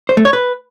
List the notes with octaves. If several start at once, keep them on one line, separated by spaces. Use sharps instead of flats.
C5
A3
C#5
B4